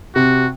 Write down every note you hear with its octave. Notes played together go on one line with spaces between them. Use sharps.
C3 F#4